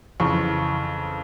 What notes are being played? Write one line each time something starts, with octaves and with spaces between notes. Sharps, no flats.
F2 C#3 E3 C#6